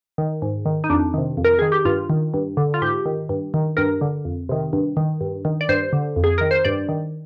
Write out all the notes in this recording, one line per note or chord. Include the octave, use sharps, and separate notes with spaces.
D#3
G#2
D#3
D#4
F2 D4
C3 D#3
F2
A#4
D#3 G#4
G4
G2 F4
D#3
G2
D3
F4
G#2 G4
D#3
G2
D#3
G2 A#4
D3
F2
C3 D#3
G2
D#3
G2
D#3
D5
G2 C5
D3
F2
G#4
D#3 A#4
C5
G2 D5
D#3